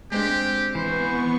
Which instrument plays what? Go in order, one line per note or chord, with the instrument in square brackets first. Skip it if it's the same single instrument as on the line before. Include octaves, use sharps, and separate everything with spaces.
[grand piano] G#3 C4 D4 [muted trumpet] G4
[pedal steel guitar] E3 [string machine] B3 C#6 [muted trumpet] C5